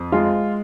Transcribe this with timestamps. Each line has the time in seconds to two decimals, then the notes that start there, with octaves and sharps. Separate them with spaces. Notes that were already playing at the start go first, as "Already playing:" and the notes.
Already playing: F2
0.12 G#3 F4